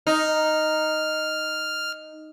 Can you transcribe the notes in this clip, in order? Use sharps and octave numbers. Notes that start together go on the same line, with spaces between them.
D#4 F6